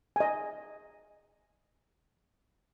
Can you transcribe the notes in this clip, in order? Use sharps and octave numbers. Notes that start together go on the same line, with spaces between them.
D#5 G#5